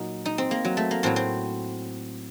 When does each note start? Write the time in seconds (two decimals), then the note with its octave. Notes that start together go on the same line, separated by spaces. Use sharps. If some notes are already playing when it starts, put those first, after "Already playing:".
Already playing: A#2 F#3 D#4
0.26 D#4
0.38 C4
0.51 A#3
0.65 F#3
0.77 A3
0.91 A#3
1.03 A2 F#3 C4
1.16 C4